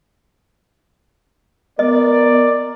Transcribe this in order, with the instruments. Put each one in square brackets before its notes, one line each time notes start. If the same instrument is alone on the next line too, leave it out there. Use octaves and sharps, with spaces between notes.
[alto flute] B3 [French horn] A#4 [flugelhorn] D5 [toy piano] D#5